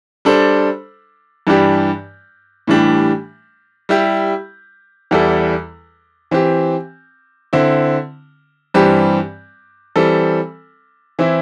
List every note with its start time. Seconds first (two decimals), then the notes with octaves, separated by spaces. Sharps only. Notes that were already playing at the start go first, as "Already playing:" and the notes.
0.25 G3 D4 A4 C5
1.47 G2 E3 G3 D4 G4
2.67 A2 E3 G3 D4 G4
3.89 G3 E4 G4
5.11 E2 E3 G3 E4 A4
6.31 E3 C4 G4
7.53 D3 C4 E4
8.74 G2 E3 G3 C4 G4
9.96 E3 G3 C4 A4
11.19 E3 C4 E4